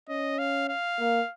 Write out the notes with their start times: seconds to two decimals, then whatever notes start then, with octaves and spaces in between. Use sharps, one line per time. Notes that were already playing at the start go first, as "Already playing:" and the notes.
0.09 C#4 D#5
0.39 F5
0.69 F5
0.99 A#3